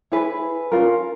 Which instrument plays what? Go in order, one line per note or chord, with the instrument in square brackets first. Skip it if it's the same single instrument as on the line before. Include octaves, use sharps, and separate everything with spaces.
[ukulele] E4 G#4 B4
C#4 F4 A#4